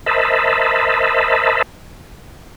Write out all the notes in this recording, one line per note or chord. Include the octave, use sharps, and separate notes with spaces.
A#4 C5 D#5 E5 A5 B5